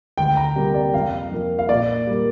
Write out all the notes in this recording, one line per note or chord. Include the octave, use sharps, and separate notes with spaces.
D2 G5
A#5
C3 G3 A#3
D5
F2 F5
F3 A#3
F5
A#2 D5
G3 A#3